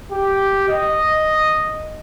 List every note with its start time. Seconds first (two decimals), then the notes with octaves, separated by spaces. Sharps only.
0.12 G4
0.69 D#5